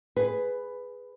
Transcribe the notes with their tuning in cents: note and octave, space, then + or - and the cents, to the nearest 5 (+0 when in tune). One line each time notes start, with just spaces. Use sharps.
G#4 +0 B4 +10